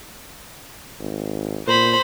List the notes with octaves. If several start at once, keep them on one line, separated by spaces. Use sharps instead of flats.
G#1
A#2 C5 B5